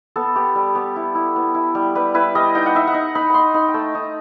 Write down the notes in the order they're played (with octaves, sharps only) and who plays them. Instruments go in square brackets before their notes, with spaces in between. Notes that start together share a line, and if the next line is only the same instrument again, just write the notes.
[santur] B3 A4
B3 G4
G3
B3 G4
E4
E4
B3
E4
G3
G3 B4
E4 B4
G3 D#5
D#4 G5
F#5
D#4 E5
F#5
D#4
D#4 B5
D#4 B5 C6
D#4 B5
G5
A3 A5
D#4